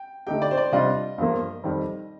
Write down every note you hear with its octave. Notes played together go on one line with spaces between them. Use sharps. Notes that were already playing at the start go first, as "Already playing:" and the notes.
Already playing: G5
D3 A3 D#4 G4 G5
D5
C5
D5
C3 G3 D4 F4 D#5
G2 F3 A#3
F2 D#3 G3